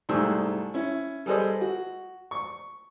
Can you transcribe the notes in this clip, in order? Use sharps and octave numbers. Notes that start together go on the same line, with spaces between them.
C2 G#2 A3 G#4 C5 E6
C#4 E4
G3 G#4 A4 B4 C5 D#5
F#4
C#6